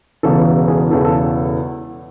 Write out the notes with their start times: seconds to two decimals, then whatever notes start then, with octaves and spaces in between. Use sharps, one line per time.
0.23 E1 E2 C#3 E3 A4
0.68 G#4
0.90 E1 E2 C#3 E3 A4
1.04 A4